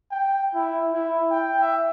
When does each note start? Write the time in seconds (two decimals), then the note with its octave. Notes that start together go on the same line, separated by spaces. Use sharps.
0.12 G5
0.54 E4
0.93 E4
1.31 G5
1.61 E5